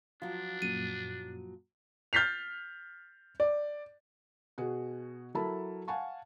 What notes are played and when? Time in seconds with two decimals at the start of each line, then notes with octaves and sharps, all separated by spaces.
0.22 F3 F#3 D4 F4
0.62 F#2 A#2 D#7
2.13 F6 G6 A6 B6 C7 F7
3.40 D5
4.58 B2 F#4 G#4
5.35 F#3 E4 A4 A#4 A5 B5
5.88 F5 F#5 G#5 A5 C#6